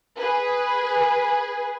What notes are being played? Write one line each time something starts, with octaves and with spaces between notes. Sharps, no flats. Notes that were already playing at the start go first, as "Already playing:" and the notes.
G#4 B4